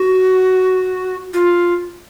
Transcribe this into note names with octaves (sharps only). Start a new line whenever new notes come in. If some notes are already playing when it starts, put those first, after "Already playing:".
Already playing: F#4
F4